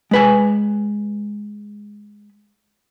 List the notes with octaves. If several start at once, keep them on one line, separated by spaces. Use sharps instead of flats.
G#3 B4 G#5